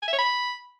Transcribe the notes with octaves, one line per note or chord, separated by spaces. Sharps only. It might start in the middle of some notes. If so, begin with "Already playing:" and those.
G#5
E5
C#5
B5